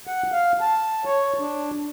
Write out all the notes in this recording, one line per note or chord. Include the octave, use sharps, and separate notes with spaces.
F#5
F5
A5
C#5
D4